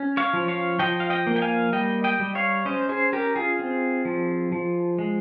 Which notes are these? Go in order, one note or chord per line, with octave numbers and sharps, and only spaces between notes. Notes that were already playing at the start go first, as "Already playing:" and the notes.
Already playing: C#4
C#5 F5
F3
C#5 F5
F3 D#5 G5
F5
D#5 G5
A#3
G5
F5 G#5
G3 D#5 G5
D#5 G5
G3
C#5 F5
C#4 C5 D#5
G#4 C5
C#4 G4 A#4
F4 G#4
C4
F3
F3
G#3